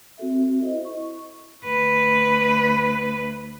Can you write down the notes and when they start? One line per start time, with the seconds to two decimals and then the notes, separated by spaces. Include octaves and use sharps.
0.18 C4 F#4 A4 E5
0.61 E4 C5 D#5
0.85 C#6
1.65 D2 B4